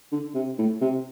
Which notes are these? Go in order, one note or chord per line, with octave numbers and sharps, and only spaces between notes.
D3
C3
A2
C3